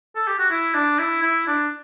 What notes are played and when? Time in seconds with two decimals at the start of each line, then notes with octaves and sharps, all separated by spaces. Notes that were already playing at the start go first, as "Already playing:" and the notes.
0.15 A4
0.27 G4
0.39 F#4
0.50 E4
0.74 D4
0.99 E4
1.22 E4
1.47 D4